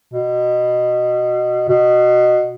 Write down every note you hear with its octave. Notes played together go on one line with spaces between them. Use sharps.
B2
B2